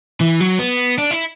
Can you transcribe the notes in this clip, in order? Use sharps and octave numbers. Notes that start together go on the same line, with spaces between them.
E3
F#3
B3
D4
E4